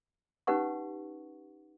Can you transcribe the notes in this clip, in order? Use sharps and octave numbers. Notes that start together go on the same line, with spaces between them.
C#4 D#4 G4 B4 F#5 C#6